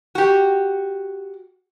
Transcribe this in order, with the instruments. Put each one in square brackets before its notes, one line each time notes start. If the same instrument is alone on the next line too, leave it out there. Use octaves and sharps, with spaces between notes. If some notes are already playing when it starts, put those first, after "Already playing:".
[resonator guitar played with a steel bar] F#4 G4